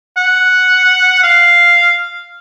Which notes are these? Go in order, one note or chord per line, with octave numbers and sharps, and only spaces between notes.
F#5
F5